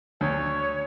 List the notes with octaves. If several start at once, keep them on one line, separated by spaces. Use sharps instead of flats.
D2 C#5